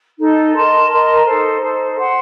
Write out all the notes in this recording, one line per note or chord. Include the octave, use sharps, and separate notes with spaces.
D#4 A4 D#5
A#4 D#5 A5 C6
A#4 D#5 A5 C6
D#4 A4 C5
D#4 A4 C5
C5 F#5 C6